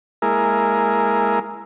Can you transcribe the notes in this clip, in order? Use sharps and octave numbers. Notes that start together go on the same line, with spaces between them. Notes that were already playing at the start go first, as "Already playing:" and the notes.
G#3 A#3 E4 G#4 A#4